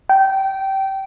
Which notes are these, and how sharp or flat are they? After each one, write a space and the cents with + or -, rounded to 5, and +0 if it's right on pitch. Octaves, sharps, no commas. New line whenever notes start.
G5 -20